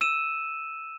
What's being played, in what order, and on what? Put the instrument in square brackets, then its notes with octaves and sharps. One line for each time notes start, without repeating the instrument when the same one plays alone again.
[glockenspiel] E6 D#7 E7